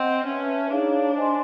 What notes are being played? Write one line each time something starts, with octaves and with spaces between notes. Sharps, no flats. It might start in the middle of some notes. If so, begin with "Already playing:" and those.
Already playing: C4 D#5 F#5
C#4 B4 E5 A5 C6
D4 D#4 G#4 C#5 F5
C5 D#5 G#5 C6